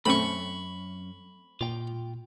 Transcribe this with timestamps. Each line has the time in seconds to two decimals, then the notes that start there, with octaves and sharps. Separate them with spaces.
0.06 F#2 A3 C4 C#4 B5 C#6
1.61 A#2 F4 G5